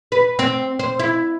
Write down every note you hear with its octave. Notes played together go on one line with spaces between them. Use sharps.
B4
C4
C5
E4